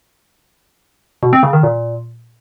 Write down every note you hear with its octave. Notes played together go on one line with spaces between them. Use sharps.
B2
C4
C#3
D#3
A#2